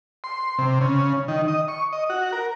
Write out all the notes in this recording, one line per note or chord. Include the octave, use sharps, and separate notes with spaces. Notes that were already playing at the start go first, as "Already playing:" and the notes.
C6
C3
C#3
D#3
D#5
C#6
D#5
F#4
A#4